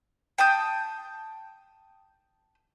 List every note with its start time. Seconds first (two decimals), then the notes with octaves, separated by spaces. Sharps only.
0.38 G5 A5 D#6 G6